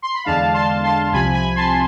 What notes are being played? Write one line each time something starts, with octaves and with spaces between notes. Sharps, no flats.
C6
B5
E2 D3 G#3 D4 F5 A5
A5 C6
A5 C6
C2 C3 F3 G#5 B5
G#5 B5
A5 C6